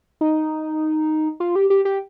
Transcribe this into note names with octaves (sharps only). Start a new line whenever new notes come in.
D#4
F4
G4
G4
G4